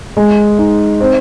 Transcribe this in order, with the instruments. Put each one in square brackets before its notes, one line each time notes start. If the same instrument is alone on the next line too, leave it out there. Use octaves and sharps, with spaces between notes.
[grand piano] G#3
D#4
C4